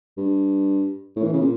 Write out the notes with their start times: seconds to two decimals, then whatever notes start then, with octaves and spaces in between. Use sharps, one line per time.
0.17 G2
1.16 A2
1.24 E3
1.33 C#3
1.41 A#2